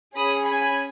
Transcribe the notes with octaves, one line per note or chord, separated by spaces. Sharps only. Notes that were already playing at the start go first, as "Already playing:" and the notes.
C#4 G#4 B5 D#6
G#5 B5